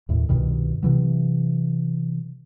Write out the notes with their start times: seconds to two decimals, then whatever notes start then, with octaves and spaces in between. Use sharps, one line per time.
0.09 D#2 A2
0.29 C2 G2 B2 D#3
0.83 C3 E3 F#3